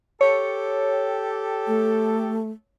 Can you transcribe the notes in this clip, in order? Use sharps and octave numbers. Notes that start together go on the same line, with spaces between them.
G4 A4 C#5
A3